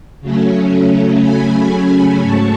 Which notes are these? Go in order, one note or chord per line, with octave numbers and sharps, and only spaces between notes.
C#3 F#3 A3 C#4
G#5 B5
G#2 F#3 A3 A5 C#6